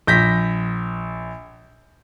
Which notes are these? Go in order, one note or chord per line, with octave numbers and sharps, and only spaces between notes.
A#1 G6 A#6 B6